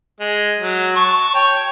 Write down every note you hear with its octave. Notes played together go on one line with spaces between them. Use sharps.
G#3
F#3
A5 C#6
C#5 G5